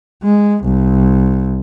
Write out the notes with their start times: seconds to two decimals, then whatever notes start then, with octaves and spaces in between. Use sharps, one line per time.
0.23 G#3
0.64 C2